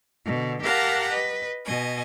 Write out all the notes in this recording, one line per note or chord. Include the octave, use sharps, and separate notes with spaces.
B2 D3
G4 A#4 F5 F#5 A5 A#5
B4 D#5
B2 D#5 G#5